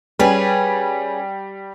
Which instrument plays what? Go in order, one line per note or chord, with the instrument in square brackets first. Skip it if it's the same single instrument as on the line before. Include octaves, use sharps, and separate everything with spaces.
[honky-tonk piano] G3 [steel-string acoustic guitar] C#4 G#4 B4